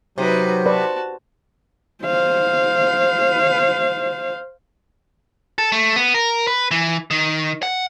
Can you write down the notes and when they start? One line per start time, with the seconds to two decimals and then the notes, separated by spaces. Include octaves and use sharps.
0.18 C3 F#3 D#4 B4
0.66 F#4 B4 D5 A5
2.04 C5 F5
5.58 A4
5.72 A3
5.96 B3
6.14 A#4
6.47 B4
6.71 E3
7.11 D#3
7.63 F#5